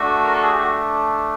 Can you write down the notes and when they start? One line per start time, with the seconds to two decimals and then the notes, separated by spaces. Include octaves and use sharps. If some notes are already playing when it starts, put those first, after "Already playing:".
Already playing: A3 D4 F#4
0.24 A#4
0.33 A4
0.42 G#4
0.51 G4
0.60 F#4